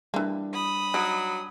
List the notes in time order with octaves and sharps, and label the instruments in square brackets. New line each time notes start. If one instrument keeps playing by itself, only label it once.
[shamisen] E3 A#3 [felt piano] G3 D4
[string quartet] B5 D#6
[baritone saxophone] F#3 [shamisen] D#4